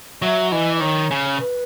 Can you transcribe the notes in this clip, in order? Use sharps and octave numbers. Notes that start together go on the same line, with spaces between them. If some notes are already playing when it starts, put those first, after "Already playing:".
F#3 E5
E3 D#5
D#5
D#3 C#5
C#3
B4